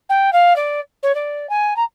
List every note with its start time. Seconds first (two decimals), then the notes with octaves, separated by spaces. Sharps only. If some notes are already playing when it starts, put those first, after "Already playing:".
0.09 G5
0.33 F5
0.56 D5
1.03 C#5
1.15 D5
1.50 G#5
1.77 A#5